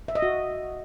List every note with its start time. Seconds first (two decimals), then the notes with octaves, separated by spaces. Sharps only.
0.08 E5
0.15 D#5
0.22 F#4